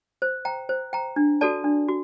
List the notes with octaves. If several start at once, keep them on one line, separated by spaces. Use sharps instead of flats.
C5
G5 A#5
C5
G5 A#5
D4
F#4 A4 D5 A5
D4
F#4